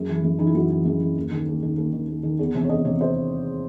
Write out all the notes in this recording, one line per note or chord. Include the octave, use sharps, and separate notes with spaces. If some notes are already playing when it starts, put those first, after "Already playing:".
Already playing: F#2 G#4
E3
F#2
E3 D#4
E4
F#2 F#4
E3
F#2 G#4
E3
D#2
D#3
D#2
D#3
D#2
D#3
D#2
D#3
E2
C3 E3
C#5
E2 D#5
C3 E3 C#5
C5